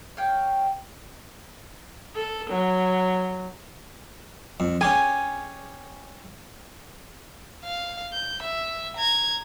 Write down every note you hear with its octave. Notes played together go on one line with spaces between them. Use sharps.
C#5 F5 G5
A4
F#3
F2
C#4 G4 G#4 G#5
F5
G6
E5
A#5 G#6